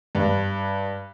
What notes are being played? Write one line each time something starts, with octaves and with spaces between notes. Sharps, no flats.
G2